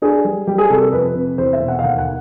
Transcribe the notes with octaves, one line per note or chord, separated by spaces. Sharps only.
D4 G#4
G3
G3 G4
G#4
C3 A4
A#4
F2 B4
C3
E2 C5
E5
B2
F#5
F5
D#2 F#5
F#5